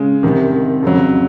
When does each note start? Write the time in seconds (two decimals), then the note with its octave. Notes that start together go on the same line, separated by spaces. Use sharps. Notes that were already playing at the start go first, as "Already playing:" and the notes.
Already playing: C#3 G#3
0.23 C2 C3 D#3
0.83 F2 C#3 F#3